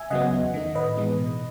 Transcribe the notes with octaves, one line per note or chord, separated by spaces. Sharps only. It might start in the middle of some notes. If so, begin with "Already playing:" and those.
Already playing: E5 G#5
C#3 F#3 B3 D#5 F#5
E2
D#3 A3 D#4
A2 B4 D#5
E3 G#3 B3 D#4
B2